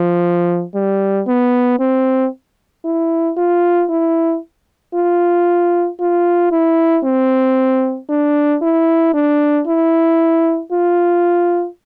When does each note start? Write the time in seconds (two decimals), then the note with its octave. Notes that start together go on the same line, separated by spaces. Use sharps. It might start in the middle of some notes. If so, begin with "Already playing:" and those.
Already playing: F3
0.75 G3
1.27 B3
1.79 C4
2.85 E4
3.37 F4
3.90 E4
4.94 F4
6.00 F4
6.52 E4
7.04 C4
8.09 D4
8.62 E4
9.14 D4
9.67 E4
10.72 F4